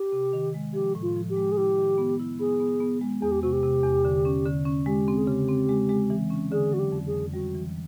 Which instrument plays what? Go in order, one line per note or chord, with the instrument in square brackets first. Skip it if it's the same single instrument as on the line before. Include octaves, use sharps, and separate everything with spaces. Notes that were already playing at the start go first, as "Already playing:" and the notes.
Already playing: [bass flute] G4
[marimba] C3
D#3
G#3
[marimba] F3 [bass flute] G4
[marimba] A2
[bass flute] F4
[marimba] F3
[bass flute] G4
[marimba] G#3
[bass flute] G#4
[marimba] E4 [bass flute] G4
[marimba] D#3
B3
E4
[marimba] B3 [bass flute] G#4
[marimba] B3
B3
G#3
[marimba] E2 [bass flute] G#4
[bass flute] G4
[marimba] C3 [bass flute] F#4
[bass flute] G4
[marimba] C3
E2
D3
C#4
D3
C#4
[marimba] G#3 [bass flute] G4
[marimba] C4
[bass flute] G#4
[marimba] C#3 [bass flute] G4
[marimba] C4
G#3
G#3
E3
C#4
[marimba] D3 [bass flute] G#4
[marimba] F#3 [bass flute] F#4
[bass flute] G4
[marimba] F2
[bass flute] G#4
[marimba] F2
[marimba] G3 [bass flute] F#4
[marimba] E3